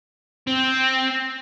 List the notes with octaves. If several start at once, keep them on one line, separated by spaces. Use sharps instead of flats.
C4